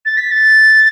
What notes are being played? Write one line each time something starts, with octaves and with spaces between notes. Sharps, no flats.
A6
B6
A6